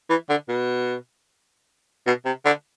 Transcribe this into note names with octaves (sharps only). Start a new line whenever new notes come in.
E3
D3
B2
B2
C3
D3